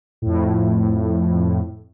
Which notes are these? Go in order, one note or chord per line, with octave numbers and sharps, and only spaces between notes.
F2 A2